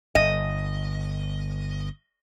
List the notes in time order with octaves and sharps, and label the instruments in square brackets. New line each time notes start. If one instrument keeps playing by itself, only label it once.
[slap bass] G1 [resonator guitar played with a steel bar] D#5